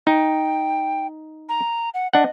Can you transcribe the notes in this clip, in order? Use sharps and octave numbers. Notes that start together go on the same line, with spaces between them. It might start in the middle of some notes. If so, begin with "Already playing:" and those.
D#4 G5
A#5
F#5
D4 D#5 F#5